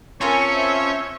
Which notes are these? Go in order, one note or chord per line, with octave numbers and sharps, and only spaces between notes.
C4 C#4 F4 A4 A#4 C#5 G#5
C5 E5